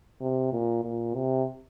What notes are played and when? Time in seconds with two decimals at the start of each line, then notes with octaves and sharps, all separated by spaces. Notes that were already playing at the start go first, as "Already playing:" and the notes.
0.20 C3
0.53 A#2
0.84 A#2
1.15 C3